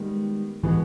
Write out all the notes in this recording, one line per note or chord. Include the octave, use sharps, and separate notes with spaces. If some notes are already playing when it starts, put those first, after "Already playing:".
Already playing: D#3 G3 G#3 B3
B2 E3 G#3 B3